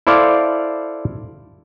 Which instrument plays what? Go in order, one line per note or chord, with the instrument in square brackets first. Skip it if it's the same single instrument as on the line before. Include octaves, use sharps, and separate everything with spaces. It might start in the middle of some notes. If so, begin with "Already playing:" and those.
[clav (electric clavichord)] E4 A4 C5 D5 F5